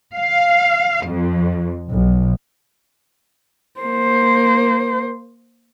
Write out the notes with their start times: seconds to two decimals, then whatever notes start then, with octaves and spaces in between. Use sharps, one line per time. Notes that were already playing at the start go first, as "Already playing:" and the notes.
0.13 F5
1.04 F2
1.89 B1
3.81 A#3 C5